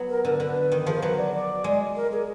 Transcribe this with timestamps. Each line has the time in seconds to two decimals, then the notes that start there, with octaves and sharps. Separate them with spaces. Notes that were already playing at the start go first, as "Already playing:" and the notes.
Already playing: F#3 B3
0.09 A#4
0.24 D3 A#4
0.34 A#4
0.40 D3 B4
0.72 D#3
0.86 F3 G#4
0.94 A#4
1.02 F#3 B4
1.17 D5
1.34 D5
1.64 G#3
1.96 A#4
2.11 G#4